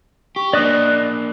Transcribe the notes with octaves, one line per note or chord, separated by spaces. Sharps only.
G4 C#6
A#3 D4 D5 D#5 D#6 F#6